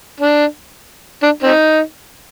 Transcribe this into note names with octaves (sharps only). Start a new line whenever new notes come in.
D4
D4
C4 D#4